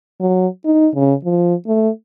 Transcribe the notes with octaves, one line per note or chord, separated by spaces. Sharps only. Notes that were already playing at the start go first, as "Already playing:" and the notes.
F#3
D#4
C#3
F3
A3